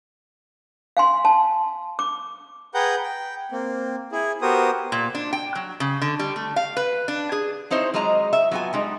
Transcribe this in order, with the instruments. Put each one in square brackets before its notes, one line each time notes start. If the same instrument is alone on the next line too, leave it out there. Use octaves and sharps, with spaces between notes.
[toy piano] F5 G#5 C6
A5
D6
[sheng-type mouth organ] G#4 B4 F#5 G5 A#5 G6
G5
A#3 C4
E4 G#4
B3 F#4 G4 A#4 C5 D#6
[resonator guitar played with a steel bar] A#2
D4
G5
F#3
C#3
D3
G3
A3
F5
B4
D4
G#4
C4 D#4 E4 C5 C#5
F#3 G#3 F4 D#5 A#5
E5
F#3 B3 F4 D5 G#5
G3 G#3 D#4